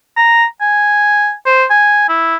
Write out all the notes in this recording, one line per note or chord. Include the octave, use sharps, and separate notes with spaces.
A#5
G#5
C5
G#5
E4